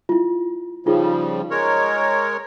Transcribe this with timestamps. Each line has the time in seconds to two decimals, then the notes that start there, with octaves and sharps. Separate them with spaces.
0.09 E4 F4
0.86 C#3 F3 G3 D#4 F4 G#4
1.51 G#3 A#4 C#5